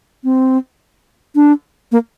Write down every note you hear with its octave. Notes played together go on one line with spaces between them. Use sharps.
C4
D4
A#3